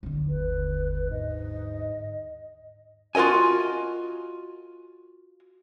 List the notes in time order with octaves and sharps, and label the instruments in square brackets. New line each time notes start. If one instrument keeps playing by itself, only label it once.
[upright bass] D#2 D3
[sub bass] G1 [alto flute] B4
[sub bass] G#2 [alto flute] D#5
[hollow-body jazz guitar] F4 F#4 A#4 D#5 G#5